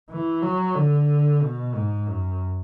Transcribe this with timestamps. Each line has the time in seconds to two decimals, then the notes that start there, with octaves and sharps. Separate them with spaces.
0.10 E3
0.43 F#3
0.75 D3
1.42 B2
1.74 G#2
2.07 F#2